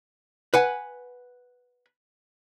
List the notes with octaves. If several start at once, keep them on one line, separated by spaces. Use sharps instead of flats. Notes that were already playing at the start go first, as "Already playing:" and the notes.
B4 F#5 G#5